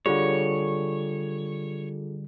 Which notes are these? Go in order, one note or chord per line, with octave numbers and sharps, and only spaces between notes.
D3 G3 F4 G#4 A4 C#5